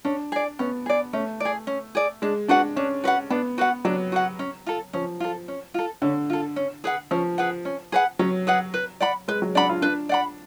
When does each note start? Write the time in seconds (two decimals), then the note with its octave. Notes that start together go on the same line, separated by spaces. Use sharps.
0.05 C#4 D4
0.32 G#4 D5
0.59 B3 C#4
0.86 G#4 D5
1.13 A3 C#4
1.40 G#4 D5
1.67 C#4
1.95 G#4 D5
2.22 G#3 D4
2.48 D4 F#4 B4 F#5
2.76 C#4 D4
3.04 F#4 B4 F#5
3.30 B3 D4
3.58 F#4 B4 F#5
3.85 F#3 D4
4.12 F#4 B4 F#5
4.39 C#4
4.66 F4 A4
4.93 F3 C#4
5.20 F4 A4
5.48 C#4
5.74 F4 A4
6.02 D3 C#4
6.30 F4 A4
6.56 C#4
6.84 G#4 B4 F#5
7.11 F3 C#4
7.38 G#4 B4 F#5
7.65 C#4
7.92 G#4 B4 F#5
8.19 F#3 C#4
8.47 G#4 B4 F#5
8.74 B4
9.00 D5 F#5 B5
9.28 G#3 B4
9.42 F#3
9.55 D4 D5 F#5 B5
9.69 F4
9.82 D4 B4
10.09 D5 F#5 B5